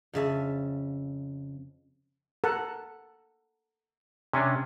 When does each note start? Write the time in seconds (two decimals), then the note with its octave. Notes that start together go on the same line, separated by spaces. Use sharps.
0.13 F2 C#3 E5 A5
2.44 A4 A#4 F#5
4.33 C3 C#4 D4 G#5